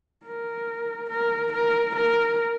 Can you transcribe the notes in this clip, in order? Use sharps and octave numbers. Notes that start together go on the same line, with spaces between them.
A#4
A#4
A#4
A#4